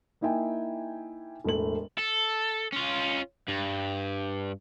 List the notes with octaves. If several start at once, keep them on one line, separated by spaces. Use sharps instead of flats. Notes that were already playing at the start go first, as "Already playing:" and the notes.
A#3 D#4 E4 E5 G5 G#5
E1 A2 A3 F#7
A4
C#4 F4
G2